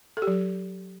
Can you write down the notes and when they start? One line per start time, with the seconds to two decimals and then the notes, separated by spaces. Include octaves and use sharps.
0.17 A4
0.22 G4
0.27 F#3